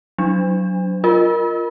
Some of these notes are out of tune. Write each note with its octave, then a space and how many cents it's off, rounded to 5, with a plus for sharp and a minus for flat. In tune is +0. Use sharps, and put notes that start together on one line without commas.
F#3 +0 D4 -10
F4 +0 A#4 +0 D#5 +0